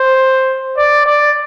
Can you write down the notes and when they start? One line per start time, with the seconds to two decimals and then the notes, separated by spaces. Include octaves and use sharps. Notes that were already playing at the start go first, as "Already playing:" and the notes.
Already playing: C5
0.77 D5
1.06 D5